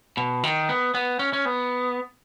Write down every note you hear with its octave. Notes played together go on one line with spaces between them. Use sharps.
B2
D#3
B3
B3
C#4
C#4
B3